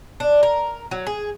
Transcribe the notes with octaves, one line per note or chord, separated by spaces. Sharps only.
D4
A#4
F#3
G#4